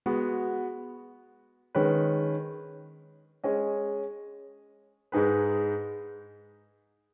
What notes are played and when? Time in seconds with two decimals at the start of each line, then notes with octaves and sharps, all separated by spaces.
0.06 G#3 B3 F#4
1.75 D#3 G#3 C#4 B4
3.44 G#3 C#4 G#4 D#5
5.12 G#2 G#3 D#4 G#4 B4